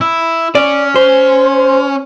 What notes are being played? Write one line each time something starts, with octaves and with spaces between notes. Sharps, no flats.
E4
C#4 D5
C5